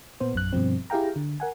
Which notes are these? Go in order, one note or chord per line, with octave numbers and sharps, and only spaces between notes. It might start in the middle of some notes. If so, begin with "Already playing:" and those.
A#2 B3 C5
A#1 F#2 F#6
G2 B2 F3 C4
E4 G4 G#4 F5 G5 A#5
D3
A#4 F#5 G#5